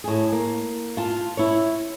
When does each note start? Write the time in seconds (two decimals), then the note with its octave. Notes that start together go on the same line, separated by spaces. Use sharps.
0.04 A2 G#4
0.32 A#3
0.97 F4 A5
1.37 E4 C#5